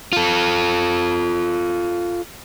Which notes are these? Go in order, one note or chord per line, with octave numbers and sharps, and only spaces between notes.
F4 A4